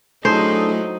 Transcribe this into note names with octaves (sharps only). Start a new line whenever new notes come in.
A2 F#3 D4 D#4 G#4 A4 C5